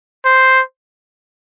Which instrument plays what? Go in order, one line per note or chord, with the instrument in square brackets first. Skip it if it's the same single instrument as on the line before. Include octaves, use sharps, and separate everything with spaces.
[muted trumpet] C5